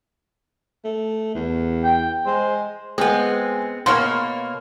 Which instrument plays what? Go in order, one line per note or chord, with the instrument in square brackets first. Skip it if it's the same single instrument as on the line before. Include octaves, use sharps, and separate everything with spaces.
[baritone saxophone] A3
E2
[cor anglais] G5
[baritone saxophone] G#3 [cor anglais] C5
[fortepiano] G#3 [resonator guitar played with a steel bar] B3 C4
[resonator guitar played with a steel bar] B2 A#3 C#5 [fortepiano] C6 F6